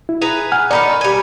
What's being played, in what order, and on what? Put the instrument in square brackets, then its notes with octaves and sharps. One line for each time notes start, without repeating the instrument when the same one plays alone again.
[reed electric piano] E4
[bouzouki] G#4 B4 A#5
[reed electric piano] F#5 G#5 F6
[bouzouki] D#3 D#4 A4 [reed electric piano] D5 A#5 B5
[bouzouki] G3 G#5